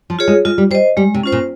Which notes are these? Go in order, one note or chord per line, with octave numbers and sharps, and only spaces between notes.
F3
F4 G#4 C#5
G#3
G#3 F4
G3
G3 C5 D#5
G3 G#3
C3
C#4 F4 C5
A#2